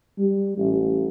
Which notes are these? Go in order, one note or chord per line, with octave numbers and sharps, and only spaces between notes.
G3
A1